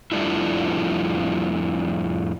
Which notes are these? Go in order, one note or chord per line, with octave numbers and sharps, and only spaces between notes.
F2 F3 G3 A3 D4 E4